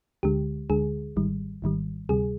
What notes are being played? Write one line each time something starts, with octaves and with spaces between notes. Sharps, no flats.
D2 D3 G#3 G4
D2 D3 G#3 G#4
G#1 G#2 D#3 G3
G#1 G#2 D#3 G3
D2 C3 G3 G#4